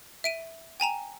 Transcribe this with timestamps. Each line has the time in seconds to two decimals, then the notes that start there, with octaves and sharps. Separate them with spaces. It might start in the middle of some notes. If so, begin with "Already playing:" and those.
0.24 E5 D7 D#7
0.80 G5 G#5 A#5 E7